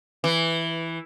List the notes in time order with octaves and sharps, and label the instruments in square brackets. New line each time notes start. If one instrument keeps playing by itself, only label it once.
[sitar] E3